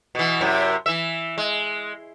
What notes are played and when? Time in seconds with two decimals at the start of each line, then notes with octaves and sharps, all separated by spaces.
0.15 B2 E3
0.41 F#2 C3 E4
0.86 E3 E5
1.38 G#3